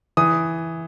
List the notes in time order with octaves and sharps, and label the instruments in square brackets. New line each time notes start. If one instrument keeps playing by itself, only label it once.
[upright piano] E3 D#6